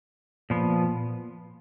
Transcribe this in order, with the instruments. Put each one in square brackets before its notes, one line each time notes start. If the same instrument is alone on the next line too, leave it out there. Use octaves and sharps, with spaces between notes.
[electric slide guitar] A#2 F3 B3